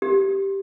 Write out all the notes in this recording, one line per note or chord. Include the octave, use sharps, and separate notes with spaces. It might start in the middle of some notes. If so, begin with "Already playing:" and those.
G4